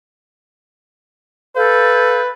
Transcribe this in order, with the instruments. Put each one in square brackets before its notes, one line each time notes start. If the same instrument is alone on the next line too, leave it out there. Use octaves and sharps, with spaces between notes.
[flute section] A4 F5 G6 [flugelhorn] B4